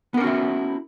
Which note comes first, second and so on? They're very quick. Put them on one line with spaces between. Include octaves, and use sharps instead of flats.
B3 A#4 C#4 F#4 E4